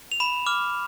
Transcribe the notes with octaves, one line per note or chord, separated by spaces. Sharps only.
F7
B5 E7
D6 F6